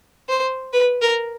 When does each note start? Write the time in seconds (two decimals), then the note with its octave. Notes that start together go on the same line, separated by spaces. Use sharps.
0.29 C5
0.73 B4
1.02 A#4